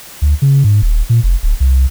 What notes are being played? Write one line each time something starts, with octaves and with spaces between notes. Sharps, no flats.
D2
C#3
G#2
D#1
A#2
F1
D1
C2